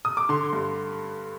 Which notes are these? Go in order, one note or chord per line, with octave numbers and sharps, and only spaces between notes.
D#6
D6
D3 C6
G2